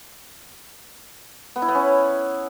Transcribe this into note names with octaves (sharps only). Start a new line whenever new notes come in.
B3
E4
B3
C#4